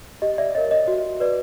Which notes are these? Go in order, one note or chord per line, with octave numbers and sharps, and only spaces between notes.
G4 D#5
D5 E5
A#4 C#5 D#5
D#5
F#4
B4 D5